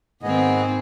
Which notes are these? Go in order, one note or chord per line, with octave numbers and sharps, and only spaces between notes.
G#2 D#3 B3 C4 G#4 D#5